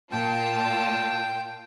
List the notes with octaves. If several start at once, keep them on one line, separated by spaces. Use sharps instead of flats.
A#2 F4 G5 A5